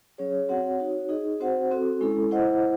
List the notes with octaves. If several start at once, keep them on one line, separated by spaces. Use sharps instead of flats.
F#3 C#4 G#4 C#5
C4 F#4 C#5 F#5
D#4 F#4 C#5
D#4 G#4 D#5
C4 F#4 C5 F#5
C4 F#4 A4
G#3 C#4 E4 A4
E4 C5 D#5 F#5